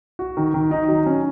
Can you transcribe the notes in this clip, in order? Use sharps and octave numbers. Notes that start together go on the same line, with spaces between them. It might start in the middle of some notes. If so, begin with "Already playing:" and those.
F#4
D#3
D#3
D#4
F#3
C#4